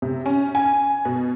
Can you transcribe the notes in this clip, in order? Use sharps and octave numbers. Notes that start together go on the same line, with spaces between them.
C3
C#4
G#5
B2